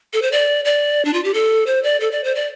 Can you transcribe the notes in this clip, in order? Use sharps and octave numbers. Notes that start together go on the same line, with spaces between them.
A4
C5
D5
D5
D4
F4
G4
A4
C5
D5
A4
D5
C5
D5